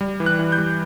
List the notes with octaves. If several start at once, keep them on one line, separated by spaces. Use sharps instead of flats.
G3
E3
F#6
E3
G6
G3